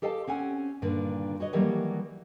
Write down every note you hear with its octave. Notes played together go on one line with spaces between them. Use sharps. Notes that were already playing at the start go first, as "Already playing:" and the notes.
G4 A4 D#5 F5 G#5 A5
C4 C#4 F#5 G#5
G2 A#2 D3 D#3
F#4 C#5 D#5
D#3 E3 F#3 G3 A3 A#3